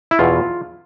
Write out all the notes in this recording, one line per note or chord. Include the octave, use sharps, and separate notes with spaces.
E4
E2 B2 F4